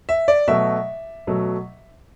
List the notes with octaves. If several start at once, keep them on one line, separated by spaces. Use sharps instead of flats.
E5
D5
B2 F#3 A3 E5
B2 F#3 A3